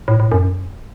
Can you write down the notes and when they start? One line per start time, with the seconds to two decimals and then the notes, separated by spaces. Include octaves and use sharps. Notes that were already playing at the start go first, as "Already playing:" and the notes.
0.08 A2
0.20 A2
0.32 F#2